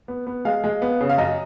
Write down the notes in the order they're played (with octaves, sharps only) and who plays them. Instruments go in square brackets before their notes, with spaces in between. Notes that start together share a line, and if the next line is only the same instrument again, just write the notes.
[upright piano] B3
B3
G#3 F5
G#3
B3
C#3
F5
F#2 D#5